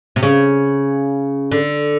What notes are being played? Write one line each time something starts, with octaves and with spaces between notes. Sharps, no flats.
C3
C#3
D3